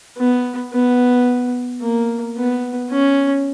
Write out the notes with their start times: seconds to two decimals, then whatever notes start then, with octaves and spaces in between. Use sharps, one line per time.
0.18 B3
0.72 B3
1.82 A#3
2.37 B3
2.91 C#4